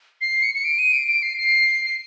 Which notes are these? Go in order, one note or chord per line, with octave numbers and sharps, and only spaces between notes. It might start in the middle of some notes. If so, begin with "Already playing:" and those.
C7
C#7
C#7
D7
D#7
D7
D7
C7
C7
C7